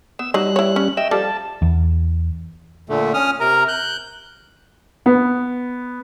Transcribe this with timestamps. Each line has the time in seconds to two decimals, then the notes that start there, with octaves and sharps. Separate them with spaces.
0.19 B3 E6
0.34 F#3 G3 D#4 F#6
0.56 E4 C#5
0.76 C#4
0.97 D#5 E5 G5 E6
1.11 F3 G3 A4 A5
1.62 E2
2.89 A#2 D3 A3
3.14 C#4 D#6 F6
3.40 C3 A#4 A#5
3.68 F#6 G6
5.06 B3